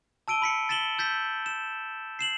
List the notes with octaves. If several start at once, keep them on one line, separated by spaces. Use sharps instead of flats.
A5 E6 D7 D#7 G7
B5 B6 C#7
A6 B6 E7 F#7 G7
E6 G6 A6 B6
E7
C7 E7 F#7